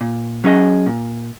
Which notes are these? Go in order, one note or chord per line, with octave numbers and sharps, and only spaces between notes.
A#2
F#3 C#4 G#4 D#5
A#2